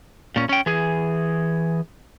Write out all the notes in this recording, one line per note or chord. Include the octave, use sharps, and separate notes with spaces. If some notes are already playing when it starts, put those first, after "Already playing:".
A#2 C#4
C#4 G5
E3 G#4